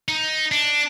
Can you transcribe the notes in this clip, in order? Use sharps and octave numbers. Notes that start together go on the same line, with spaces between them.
D#4
D4